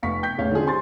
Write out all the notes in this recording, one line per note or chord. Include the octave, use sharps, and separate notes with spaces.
F1 B3 F5 C#6 B6
G5 G6 B6
E2 A2 C#3 C#5 F5
D3 G#3 F4 G#4
C3 G#3 C5 G#5 C6 A6